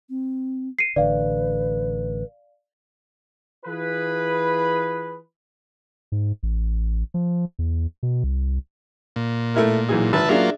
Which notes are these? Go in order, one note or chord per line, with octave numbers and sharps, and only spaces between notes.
C4
C7 C#7 D#7
A1 D3 B4 D5 F5
E3 F4 G#4 B4
G#2
A1
F3
E2
B2
C2
A#2
A3 E4 A#4
B1 E3 G#4
G#1 B4 E5 A5
F#3 A#3 D4 F4 G#4 E5